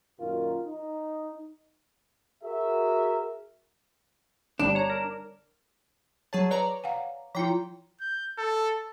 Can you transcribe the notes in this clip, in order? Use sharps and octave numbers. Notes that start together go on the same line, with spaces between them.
F#2 A#2 D#3 F4 F#4 A#4
D#4
F#4 G#4 A#4 E5
G1 G3 D4
C#5 A#5
A#4
F#3 G#4 C#5 A5
B4 C#5 D5 A#5
F5 F#5 G#5
F3 E4 F4 G5 A#5
G6
A4